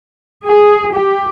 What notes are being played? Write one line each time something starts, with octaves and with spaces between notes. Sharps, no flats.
G#4
G4